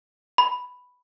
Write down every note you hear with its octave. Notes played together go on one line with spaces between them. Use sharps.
B5